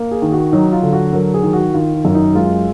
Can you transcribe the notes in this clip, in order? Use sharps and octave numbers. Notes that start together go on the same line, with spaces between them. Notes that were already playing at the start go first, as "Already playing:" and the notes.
Already playing: A#3
G#4
D#3
F#4
F#3 D#4
F4
D3
F#4
F#3 A#4
G#4
D#3
F#4
D#3 F4
F4
F#2
D#4
G#3 F4